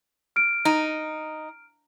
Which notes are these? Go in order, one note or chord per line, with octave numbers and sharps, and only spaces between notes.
F6 D7
D#4